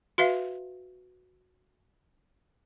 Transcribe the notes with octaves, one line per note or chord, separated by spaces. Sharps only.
F#4 B4 E5 F5